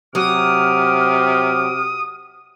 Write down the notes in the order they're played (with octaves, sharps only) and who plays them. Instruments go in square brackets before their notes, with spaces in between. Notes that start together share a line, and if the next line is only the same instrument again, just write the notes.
[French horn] C3 [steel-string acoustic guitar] F#3 [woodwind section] D6 F6 [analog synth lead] D#6